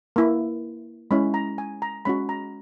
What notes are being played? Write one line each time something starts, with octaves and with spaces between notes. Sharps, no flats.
A#3 E4
G#3 C#4 E4 B5
A#5
G#5
A#5
G#3 C#4 F#4 B5
A#5